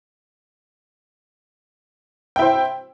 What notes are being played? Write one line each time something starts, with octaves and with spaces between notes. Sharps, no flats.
E4 C5 G5